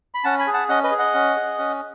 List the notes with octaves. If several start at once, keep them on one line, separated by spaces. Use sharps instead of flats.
B5
C#4 F#5 A5
G#5 B5
G#4
F#5 A5
C#4 D#5 F#5
B4 D#5
G#4
D#5 F#5
C#4
G#4
C#4